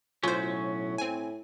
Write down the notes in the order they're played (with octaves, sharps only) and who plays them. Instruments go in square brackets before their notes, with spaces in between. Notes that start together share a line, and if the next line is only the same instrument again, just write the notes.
[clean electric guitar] B1 F#3 C#4 [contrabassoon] A2 [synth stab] F4 C5
[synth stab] C4 G#5